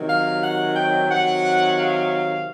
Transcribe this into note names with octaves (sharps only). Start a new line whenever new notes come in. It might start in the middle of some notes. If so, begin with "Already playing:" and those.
Already playing: C3 D#3 F#3
F5
F#5
G5
C3 D#3 F#3 F#5
F5